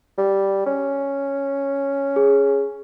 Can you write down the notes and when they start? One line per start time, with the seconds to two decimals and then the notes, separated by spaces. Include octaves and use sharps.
0.18 G3
0.66 C#4
2.16 G#4